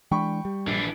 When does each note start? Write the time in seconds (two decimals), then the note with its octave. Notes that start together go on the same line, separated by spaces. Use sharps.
0.11 E3 G#3 D4 G5 B5 C#6
0.45 G3
0.67 A#1 E3 D4